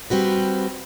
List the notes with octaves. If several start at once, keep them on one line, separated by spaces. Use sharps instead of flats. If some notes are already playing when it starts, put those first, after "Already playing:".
G3 C4 F#4 B4